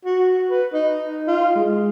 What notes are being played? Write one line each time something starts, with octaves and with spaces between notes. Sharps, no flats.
F#4
B4
D#4
F4
G#3